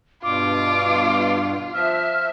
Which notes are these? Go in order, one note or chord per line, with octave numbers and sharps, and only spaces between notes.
G2 B2 F4 D6
F3 E5 F6